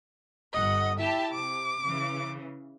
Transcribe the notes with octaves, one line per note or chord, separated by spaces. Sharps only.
G1 D#5 F#5
E4 G4 E5 A5
C3 D6
C#3 E3